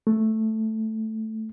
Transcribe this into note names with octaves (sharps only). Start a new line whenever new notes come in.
A3